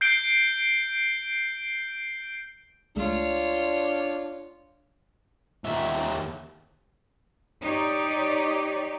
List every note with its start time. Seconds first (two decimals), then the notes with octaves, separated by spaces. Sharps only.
0.01 G6 C7 D7 G7
2.96 C#2 G#3 A3 D4 F4 C#5
5.64 D#2 E5
7.61 D#4 G4 C#5 D5